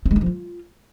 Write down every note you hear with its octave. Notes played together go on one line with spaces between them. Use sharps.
C4
G#3
D#4
F3
F4